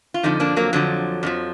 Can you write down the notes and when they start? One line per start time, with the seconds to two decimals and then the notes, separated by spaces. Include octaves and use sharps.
0.14 F4
0.23 F2 D3 F3 D#4
0.40 A#3 D4
0.56 F#3 A#3
0.73 F2 D3 F3 F#3
1.23 F2 D3 F3